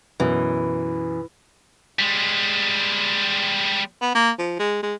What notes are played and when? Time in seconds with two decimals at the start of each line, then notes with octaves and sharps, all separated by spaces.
0.20 F#2 B2 E3
1.99 G3 G#3
4.02 B3
4.15 A#3
4.39 F3
4.59 G#3
4.83 G#3